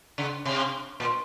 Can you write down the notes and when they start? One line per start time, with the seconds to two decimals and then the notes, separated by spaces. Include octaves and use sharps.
0.18 C#3
0.45 C3
1.00 A#2